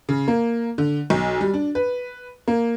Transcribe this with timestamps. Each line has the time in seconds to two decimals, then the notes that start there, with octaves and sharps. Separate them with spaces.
0.09 C#3
0.28 A#3
0.78 D3
1.10 B1
1.41 G3
1.54 D4
1.75 B4
2.48 A#3